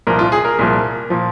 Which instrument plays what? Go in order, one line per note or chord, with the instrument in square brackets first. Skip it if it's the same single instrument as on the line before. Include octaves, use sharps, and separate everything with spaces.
[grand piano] C2 A#2 F3 A#4
F4
G#4
A#4
C2 A#2 F3
A#2 F3